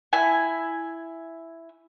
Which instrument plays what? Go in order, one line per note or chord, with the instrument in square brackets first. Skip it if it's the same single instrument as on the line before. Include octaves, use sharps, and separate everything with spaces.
[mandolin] E4 G#5